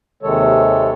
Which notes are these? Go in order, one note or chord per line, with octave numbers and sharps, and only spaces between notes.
D#2 C3 D#3 G#3 A4 C#5